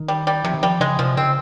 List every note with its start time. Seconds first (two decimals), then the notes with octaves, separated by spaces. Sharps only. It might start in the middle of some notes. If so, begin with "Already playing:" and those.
Already playing: D#3
0.08 G3
0.27 G3
0.44 C3 F3
0.54 D#3
0.63 F3 G3
0.80 C#3 G#3
0.99 C3 F3
1.17 C#3 C4